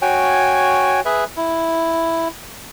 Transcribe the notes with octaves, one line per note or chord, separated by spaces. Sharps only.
F#4 C#5 G5 G#5
G#4 B4 E5
E4